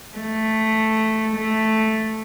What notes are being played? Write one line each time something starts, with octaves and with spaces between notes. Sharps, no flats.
A3
A3